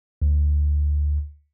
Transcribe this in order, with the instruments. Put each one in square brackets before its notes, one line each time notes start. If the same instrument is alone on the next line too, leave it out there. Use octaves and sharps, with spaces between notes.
[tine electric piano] D2